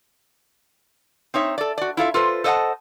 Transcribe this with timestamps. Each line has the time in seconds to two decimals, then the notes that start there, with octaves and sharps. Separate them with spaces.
1.34 C4 D#4 C#5 E5
1.58 A4 D5
1.78 F#4 D5
1.97 E4 F4 A4 E5
2.14 F4 A4 B4 C5
2.44 A4 C5 D#5 F5 F#5 A5